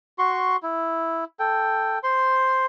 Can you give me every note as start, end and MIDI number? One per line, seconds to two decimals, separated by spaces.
0.19 0.57 66
0.19 0.57 84
0.19 0.57 85
0.63 1.24 64
1.39 1.99 69
1.39 1.99 79
2.03 2.66 72
2.03 2.66 84